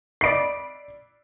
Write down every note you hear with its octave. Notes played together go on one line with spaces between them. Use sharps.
D5 D#5 B5 C7 D7